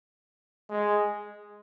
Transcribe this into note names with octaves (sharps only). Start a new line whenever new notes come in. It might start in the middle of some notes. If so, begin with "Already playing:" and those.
G#3